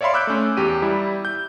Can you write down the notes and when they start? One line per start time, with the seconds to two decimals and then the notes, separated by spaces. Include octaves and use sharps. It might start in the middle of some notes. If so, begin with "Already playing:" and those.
0.01 C#5 D5 E5 F5 B5 C6
0.14 D6 E6 F#6 G6 D7
0.27 A3 C#4
0.57 E2 G4 D#7
0.82 G3 E4
1.25 G6